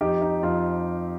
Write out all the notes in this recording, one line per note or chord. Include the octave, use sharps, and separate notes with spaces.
F2 D#4 G4
D#4
F2 F4